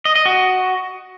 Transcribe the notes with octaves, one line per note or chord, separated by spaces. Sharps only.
D#5
D#5
F#4